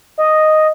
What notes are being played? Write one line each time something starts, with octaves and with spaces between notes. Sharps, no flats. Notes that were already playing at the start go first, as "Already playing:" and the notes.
D#5